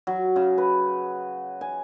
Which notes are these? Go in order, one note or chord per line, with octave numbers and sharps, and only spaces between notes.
F#3
C#3
B4
G#5